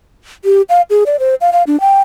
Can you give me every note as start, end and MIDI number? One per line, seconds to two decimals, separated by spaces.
0.45 0.62 67
0.69 0.82 77
0.90 1.04 68
1.06 1.19 74
1.19 1.35 72
1.41 1.51 77
1.53 1.63 77
1.67 1.79 62
1.80 2.02 79